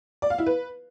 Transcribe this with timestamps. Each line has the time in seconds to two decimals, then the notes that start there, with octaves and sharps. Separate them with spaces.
0.22 D5
0.30 F5
0.38 E4
0.46 B4